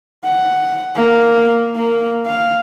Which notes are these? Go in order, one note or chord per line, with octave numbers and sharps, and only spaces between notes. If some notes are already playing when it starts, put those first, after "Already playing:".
F#5
A#3
A#3
F5